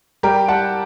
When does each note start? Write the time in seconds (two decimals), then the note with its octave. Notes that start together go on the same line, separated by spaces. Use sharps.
0.23 G3 G4 A#4
0.48 G3 F#5 A5